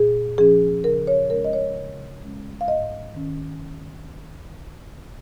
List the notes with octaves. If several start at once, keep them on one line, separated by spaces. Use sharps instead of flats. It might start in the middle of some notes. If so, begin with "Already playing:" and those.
Already playing: A#2 G#4
F3 C#4 G#4
C#3 A#4
C#5
G#3 C#4 A#4
D#5
C#5
C#3
G#3 C#4
F5
G#2 D#5
D#3 C#4